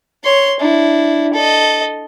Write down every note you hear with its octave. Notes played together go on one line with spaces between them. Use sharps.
C#5 C6
D4 E4
A4 D#5